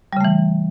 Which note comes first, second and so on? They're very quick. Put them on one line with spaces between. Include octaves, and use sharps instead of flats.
G3 C#3 A3 E3